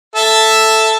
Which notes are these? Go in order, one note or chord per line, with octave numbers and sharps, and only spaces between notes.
A4 E5